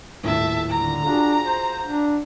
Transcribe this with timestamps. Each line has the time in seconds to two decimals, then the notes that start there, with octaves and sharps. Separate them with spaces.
0.23 D#1 A2 E5 A5
0.70 D3 A#5
1.05 D4 F4 F#4 G#4
1.45 C5
1.84 D4